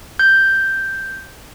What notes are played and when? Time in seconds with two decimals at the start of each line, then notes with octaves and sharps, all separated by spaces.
0.19 G6